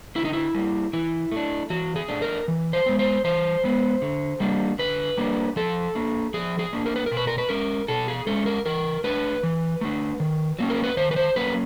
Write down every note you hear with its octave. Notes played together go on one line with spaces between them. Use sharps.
D3 E4
D#4
E4
G3 A#3
E3 E4
A3 D4
E3 F#4
G#4
A3 D4
A#4
E3
C5
G#3 B3
C5
E3 C5
G#3 B3
D3
G3 A#3 D4
D3 B4
G3 A#3 D4
F3 A4
A#3 D4
F3 G#4
G#4
A#3 D4
A#4
B4
A#4
B2
B4
A#4
B4
G#3 C#4 A#4
B2 A4
G#4
G#3 C#4 A4
A#4
E3 A#4
A3 D4 B4
E3
A3 D4
D#3
F#3 A#3 C#4
A#4
B4
D#3 C5
B4
C5
F#3 A#3 C#4 B4